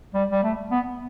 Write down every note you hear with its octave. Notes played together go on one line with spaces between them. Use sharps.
G3
G3
A3
B3